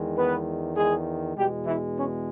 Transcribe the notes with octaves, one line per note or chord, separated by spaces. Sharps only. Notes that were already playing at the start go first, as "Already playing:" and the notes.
Already playing: E2 D#3 G#3
B3 B4
G#3 G#4
E2 B2 G3 G#3 G4
E3 E4
C#4